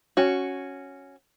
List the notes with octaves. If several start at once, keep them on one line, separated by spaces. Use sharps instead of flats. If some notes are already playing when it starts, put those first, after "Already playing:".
C#4 F#4